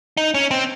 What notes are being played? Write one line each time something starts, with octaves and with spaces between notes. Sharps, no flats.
D#4
C#4
C4